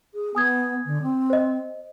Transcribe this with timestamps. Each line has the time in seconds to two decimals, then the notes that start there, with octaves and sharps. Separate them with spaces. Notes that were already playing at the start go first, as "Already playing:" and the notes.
0.14 G#4
0.35 B3 G#5 D#6 G#6
0.85 D3
1.02 C4
1.30 C5 D#5